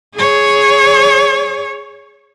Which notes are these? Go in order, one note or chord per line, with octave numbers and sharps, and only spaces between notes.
G#4 C#5